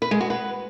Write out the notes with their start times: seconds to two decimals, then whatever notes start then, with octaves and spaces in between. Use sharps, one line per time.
0.02 B4
0.11 G#3
0.21 F#4
0.30 B4